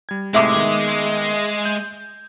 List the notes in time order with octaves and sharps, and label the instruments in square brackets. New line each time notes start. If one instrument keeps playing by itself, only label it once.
[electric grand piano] G3 G#6
[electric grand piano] A2 C3 A3 [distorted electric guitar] G#3 [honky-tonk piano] E5 D6
[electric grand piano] D#3 B3
G6